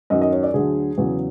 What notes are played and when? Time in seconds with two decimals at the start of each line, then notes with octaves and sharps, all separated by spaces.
0.10 F#2 D#3 F#3 D#5
0.22 D#5
0.33 C#5
0.43 D5
0.54 D2 D3 F#3 G#4
0.98 E2 C#3 F#3